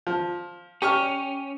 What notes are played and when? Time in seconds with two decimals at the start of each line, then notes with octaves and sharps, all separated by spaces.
0.07 F3
0.82 C#4 G4 C#6 F6